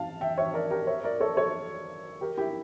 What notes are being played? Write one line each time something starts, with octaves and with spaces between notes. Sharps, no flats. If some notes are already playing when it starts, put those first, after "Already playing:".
Already playing: F5 A5
E5 G5
C#5 E5
A#4 D5
G4 A#4
C#5 E5
A#4 D5
A4 C#5
A4 C#5
G4 A#4
E4 G4